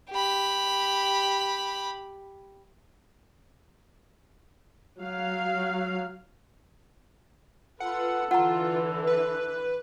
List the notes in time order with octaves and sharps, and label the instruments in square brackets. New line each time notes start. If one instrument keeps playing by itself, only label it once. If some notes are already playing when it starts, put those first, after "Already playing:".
[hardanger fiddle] G4 B5
[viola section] F#3 F5
[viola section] F4 B4 [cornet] A4 [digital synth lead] F#5
[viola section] D3 E3 [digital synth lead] F4 [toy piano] F#5 A#5
[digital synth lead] B4